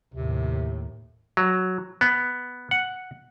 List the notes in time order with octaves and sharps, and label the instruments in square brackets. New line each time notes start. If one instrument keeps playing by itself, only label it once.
[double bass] D#2 A2 [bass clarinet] C3
[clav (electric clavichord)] F#3
B3
F#5